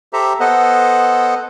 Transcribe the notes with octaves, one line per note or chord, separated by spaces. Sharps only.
G4 A4 C5 E5 A#5
B3 A4 C5 D#5 F#5